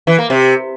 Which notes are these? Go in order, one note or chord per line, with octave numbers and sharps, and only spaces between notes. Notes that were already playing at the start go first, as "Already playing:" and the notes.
E3
A#3
C3